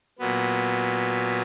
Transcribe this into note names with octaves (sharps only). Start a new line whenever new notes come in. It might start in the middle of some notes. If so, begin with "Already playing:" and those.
A#2 F#3 B3